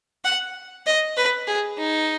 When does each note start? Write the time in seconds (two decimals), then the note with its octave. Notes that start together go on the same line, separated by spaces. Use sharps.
0.24 F#5
0.86 D#5
1.17 B4
1.47 G#4
1.78 D#4